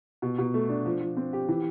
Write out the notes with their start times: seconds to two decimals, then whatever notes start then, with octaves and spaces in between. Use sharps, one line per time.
0.22 B2
0.38 B2
0.54 A3
0.69 D4
0.85 F3
1.01 F3
1.17 C4
1.33 G4
1.49 E3